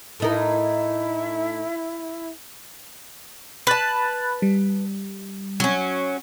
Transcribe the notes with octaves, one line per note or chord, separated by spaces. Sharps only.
A2 D#4 E4 A#4
B4 A5 B5 F#6 A6
G3
F#3 C#4